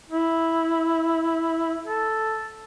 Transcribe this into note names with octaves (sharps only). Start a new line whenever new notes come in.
E4
A4